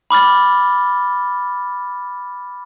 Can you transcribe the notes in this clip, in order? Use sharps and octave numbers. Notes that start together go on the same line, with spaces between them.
B5 D6 F6 A6